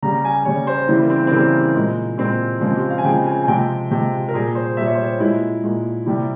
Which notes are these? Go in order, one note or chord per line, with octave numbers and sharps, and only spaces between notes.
C#3 G3 A#5
G#5
C#3 G3 C#5
C5
C#3 E3 G3 E4
A#3
C4
C4
C#3 E3 G3 A#3
A#2 G#3
A#2 G#3 C4
C#3 F3 G#3 C4
G4
F5
G#5
C#3 F3 G#3 G5
G#5
G#5
C3 F3 G#3 G5
C3 F3 G#3
A#4
A#2 G3 G#4
C5
A#2 G3 E5
C#5
C5
C#5
A#2 G#3 E4
A#2 G#3
C3 G3 E4